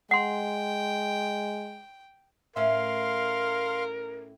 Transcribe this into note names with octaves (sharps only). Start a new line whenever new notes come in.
G#3 F#5 G5 C6
A2 C#4 A#4 E5 F5 C6